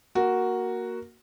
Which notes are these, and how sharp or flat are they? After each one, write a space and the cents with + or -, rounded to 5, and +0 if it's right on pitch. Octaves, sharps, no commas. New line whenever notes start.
A#3 +0 F#4 +0